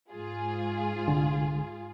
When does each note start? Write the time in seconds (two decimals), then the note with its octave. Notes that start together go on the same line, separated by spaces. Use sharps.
0.11 G#2 F4 G#4
1.08 C2 D3